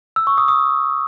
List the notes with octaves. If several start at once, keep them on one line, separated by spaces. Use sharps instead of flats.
E6
C#6
D#6
D#6